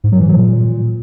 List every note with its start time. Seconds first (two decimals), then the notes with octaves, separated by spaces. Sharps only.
0.04 G#2
0.12 F#3
0.20 E3
0.29 F#3
0.37 A#2